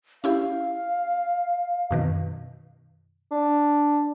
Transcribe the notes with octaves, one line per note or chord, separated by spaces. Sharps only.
C#4 E4 G4 F5
F#2 B2 D#3
D4